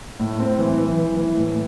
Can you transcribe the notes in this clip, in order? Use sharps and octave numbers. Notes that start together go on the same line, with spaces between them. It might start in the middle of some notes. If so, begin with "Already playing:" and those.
A2
C4
E3
E3
E3
E3
A2